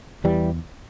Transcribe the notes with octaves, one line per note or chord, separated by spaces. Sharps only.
E2 E3 G3